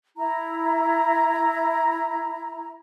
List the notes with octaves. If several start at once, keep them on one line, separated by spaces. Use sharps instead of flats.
E4 A#5